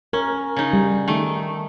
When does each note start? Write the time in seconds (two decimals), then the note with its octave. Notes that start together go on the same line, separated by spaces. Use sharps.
0.13 C#4 A#4
0.56 C#3 D#4
0.73 G3
1.08 D#3 A3